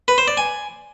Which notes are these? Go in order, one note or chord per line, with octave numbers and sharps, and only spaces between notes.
B4
C5
D5
G#5